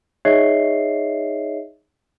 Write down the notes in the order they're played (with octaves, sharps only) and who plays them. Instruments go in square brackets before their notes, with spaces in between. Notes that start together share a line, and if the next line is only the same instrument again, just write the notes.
[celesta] D#4 G#4 C#5 D#5 E5 C7